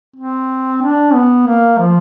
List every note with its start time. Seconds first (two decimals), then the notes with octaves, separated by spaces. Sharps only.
0.16 C4
0.82 D4
1.14 B3
1.47 A#3
1.79 F3